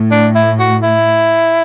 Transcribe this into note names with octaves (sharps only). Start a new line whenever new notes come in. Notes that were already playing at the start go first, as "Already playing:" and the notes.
Already playing: A2
D4
E4
F#4
E4